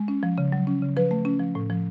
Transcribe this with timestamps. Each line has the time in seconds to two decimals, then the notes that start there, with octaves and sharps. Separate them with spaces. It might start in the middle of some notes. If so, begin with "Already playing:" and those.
Already playing: G#3
0.08 C#4
0.23 F3
0.38 C#3
0.52 F#3
0.67 C#4
0.82 C#3
0.97 F3 B4
1.11 A3
1.25 C#4
1.40 F3
1.55 A2
1.70 F3